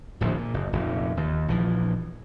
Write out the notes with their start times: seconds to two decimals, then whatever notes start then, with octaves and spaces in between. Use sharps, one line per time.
0.21 D1 A#1 F3
0.37 A#2
0.54 F#1
0.73 F1 F2 A#2
1.17 D#2
1.48 A#1 E3 F3